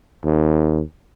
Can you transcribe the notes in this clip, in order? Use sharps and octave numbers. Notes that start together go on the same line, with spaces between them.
D#2